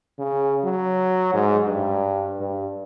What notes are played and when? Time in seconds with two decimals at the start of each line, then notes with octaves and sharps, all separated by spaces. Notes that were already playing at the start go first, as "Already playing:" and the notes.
0.19 C#3
0.64 F#3
1.34 G#2
1.66 G2
2.40 G2